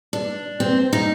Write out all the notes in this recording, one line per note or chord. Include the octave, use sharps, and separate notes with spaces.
D4
C4
D#4